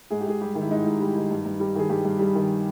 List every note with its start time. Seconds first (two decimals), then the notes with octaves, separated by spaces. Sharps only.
0.10 G#2 G#4
0.21 G4
0.26 G#2 G#4
0.41 G3 G4
0.55 D#3
0.62 E4
0.71 G#2 D#4
0.86 G#2
1.00 G3
1.16 D#3
1.30 G2
1.46 G2
1.60 G3
1.75 D#3 G#4
1.89 G2 G4
2.05 G2
2.19 G3
2.35 D#3